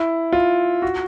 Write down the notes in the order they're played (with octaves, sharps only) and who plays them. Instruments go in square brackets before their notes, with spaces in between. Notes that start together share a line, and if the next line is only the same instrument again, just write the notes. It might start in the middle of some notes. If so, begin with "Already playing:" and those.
Already playing: [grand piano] E4
F4
F#4